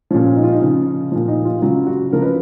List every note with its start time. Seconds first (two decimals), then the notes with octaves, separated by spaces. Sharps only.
0.11 A#2 F3 C#4
0.36 D#4
0.44 F4
0.52 D#4
0.62 C#3 F3
1.12 A#2 F3
1.28 D#4
1.45 F4
1.62 C#3 F#3 F4
1.87 F#4
2.12 C#3 F3 A#4
2.22 B4